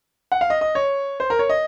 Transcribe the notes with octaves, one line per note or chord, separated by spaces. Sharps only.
F#5
F5
D#5
D#5
C#5
C5
A#4
C#5
D#5